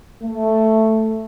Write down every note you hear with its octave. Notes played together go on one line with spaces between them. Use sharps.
A3